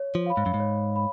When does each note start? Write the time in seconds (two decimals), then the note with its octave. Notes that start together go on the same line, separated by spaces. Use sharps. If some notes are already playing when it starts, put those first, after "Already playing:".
Already playing: C#5
0.15 F3
0.26 F5 B5
0.37 G#2
0.46 F#2
0.54 G#2
0.60 C#5
0.94 F5 B5